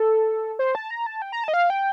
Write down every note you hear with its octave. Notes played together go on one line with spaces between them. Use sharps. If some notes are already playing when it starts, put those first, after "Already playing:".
Already playing: A4
C5
A5
A#5
A5
G5
A#5
A5
D#5
F5
G5